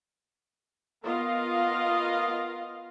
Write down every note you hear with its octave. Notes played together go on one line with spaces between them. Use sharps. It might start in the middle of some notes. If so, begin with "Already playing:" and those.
B3 F4 A#4 D#5 F5